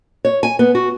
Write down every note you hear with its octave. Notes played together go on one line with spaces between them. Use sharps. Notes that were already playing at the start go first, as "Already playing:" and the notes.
C#5
G#5
B3
F#4